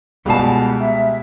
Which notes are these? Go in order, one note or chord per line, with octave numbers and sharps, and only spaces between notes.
C#2 B2 G3 G#3 A5 C7
E5